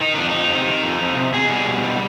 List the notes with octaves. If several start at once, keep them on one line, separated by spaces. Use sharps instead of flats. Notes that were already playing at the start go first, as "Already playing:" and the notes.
D#3 D#4
F2 D4
F2 D#4
C3
D#3
F2
F2
C3
B2 G#4
G3
B2
G3